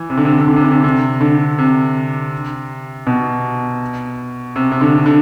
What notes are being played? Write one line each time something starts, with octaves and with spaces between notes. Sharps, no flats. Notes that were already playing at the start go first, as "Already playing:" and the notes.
Already playing: E3
C3
D3
C3
D3
C3
D3
C3
D3
C3
C3
D3
C3
B2
C3
C3
D3
D3